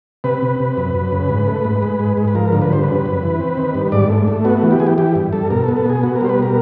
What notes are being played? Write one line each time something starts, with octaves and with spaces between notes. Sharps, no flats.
C3 B4
C3
C3
F#2
F#2
C#3
G#2
A3
G#2
G#3
G#2
G#2
B4
F3 A#4
D3
B4
G2 C5
C#3 B4
F#2
E3
C4
D#3
G2
G#2 D5
A3
A3
B3 F#4
E3
G4
E3 G#4
G4
E3 G4
G2
G2 A4
B2 A#4
A4
B3
A4
B2 G#4
B3 F#4
A#4
G3 C5
B4
B2 A#4